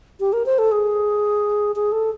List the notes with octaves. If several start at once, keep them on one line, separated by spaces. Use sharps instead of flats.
G4
A#4
C5
A4
G#4
G#4
A4